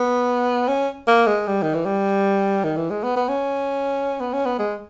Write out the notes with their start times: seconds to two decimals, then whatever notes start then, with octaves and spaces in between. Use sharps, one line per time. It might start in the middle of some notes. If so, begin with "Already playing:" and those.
Already playing: B3
0.68 C#4
1.08 A#3
1.27 G#3
1.47 G3
1.62 D#3
1.74 E3
1.86 G3
2.64 D#3
2.77 E3
2.90 G#3
3.04 B3
3.16 B3
3.29 C#4
4.20 B3
4.33 C#4
4.46 B3
4.59 G#3